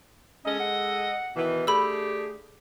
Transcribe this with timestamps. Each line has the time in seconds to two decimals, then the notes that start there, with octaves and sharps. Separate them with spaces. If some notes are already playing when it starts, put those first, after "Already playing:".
0.46 G#3 C#4 A4 D#5
0.59 F#5
1.36 B2 D#3 E3
1.67 A3 D4 G4 G#4 B5 E6